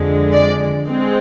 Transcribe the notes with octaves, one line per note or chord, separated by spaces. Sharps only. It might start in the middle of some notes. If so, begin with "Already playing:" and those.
Already playing: F2 D3 G#3
D5
G#3 C4